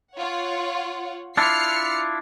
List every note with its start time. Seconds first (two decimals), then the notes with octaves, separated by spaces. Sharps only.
0.15 F4 C#5 F#5
1.37 D4 E4 F4 F6 C7 C#7